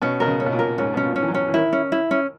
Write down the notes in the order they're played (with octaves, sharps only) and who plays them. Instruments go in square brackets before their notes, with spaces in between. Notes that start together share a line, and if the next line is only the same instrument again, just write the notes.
[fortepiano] B2 [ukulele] C#4
[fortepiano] B2 [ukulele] A#4
[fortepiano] C#3
[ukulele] C#4
[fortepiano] B2
A#2
[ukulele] A#4
[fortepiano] G#2 [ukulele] C#4
[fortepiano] B2 [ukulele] C#4
[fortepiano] A#2
[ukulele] C#4
[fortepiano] E3
F#3
[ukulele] C#4
[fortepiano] E3
[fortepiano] D#3 [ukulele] E4
[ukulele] C#4
E4
C#4